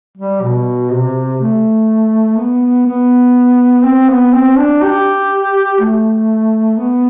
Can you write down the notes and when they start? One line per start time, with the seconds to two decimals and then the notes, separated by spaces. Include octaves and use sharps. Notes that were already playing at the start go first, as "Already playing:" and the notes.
0.17 G3
0.42 B2
0.92 C3
1.41 A3
2.38 B3
2.87 B3
3.85 C4
4.09 B3
4.33 C4
4.57 D4
4.83 G4
5.80 A3
6.78 B3